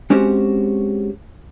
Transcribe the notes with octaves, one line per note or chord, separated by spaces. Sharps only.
G#3 C4 C#4 F#4 G4 C5